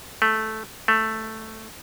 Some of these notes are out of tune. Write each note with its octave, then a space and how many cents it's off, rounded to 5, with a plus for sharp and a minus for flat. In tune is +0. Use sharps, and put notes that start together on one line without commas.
A3 -10
A3 +0